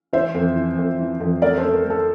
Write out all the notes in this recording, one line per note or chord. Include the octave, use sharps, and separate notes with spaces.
E3 C5 E5
F2
E3
F2
E3
F2
A3 A#4 D5
A4 C5
A3
A#4
A3
A4